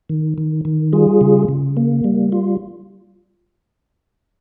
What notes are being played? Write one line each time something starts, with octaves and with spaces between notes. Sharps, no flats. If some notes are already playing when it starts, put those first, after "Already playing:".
D#3
D#3
D#3
G3 F4 G#4
C#3
C#3
A#3
G3
F4